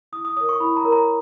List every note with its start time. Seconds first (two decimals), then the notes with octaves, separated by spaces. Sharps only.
0.13 E4 D#6
0.25 D#6
0.37 A#4 C#5 D#6
0.49 C#6
0.60 E4 B5
0.77 A#5
0.85 A#4 C#5
0.92 A#5